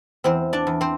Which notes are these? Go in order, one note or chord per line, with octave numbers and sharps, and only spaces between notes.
E2 C4 C5
D4 D5
E2
C4 C5